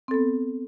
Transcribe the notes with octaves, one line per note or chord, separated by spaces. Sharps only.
B3 C4 A4